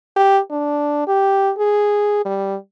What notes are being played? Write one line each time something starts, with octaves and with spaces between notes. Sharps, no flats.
G4
D4
G4
G#4
G3